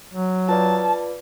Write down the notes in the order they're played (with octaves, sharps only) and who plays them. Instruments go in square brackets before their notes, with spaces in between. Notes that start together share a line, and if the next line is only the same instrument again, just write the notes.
[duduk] F#3
[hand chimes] F4 B4 D5 [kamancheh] A5